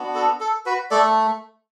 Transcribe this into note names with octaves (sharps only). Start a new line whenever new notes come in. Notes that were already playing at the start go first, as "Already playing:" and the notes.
Already playing: B3 D4 F#4
A4
A4
F#4 B4
A3 A4 D5